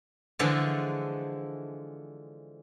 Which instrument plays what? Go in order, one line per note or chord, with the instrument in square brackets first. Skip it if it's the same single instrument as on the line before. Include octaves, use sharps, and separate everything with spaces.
[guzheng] D3 E3 F3 G#3 A4